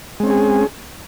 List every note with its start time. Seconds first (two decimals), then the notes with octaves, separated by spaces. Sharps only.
0.20 G#3
0.23 C4
0.27 C#4
0.30 G#4